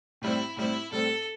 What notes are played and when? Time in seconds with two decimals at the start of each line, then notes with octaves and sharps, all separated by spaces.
0.22 A2 G3 C4 E4
0.57 A2 G3 C4 E4
0.92 A2 G3 C4 A4